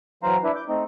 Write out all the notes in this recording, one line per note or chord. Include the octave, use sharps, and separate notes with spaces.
E3 F#3 C5 F5 A#5
D4 E4 B4
D6 G6
A3 C4 D#4